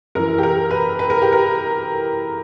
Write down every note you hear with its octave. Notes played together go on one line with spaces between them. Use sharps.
F#2 E3 A#4
G4
A#4
B4
B4
A#4
G4
A#4